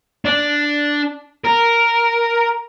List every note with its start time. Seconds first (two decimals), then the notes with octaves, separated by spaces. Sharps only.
0.25 D4
1.44 A#4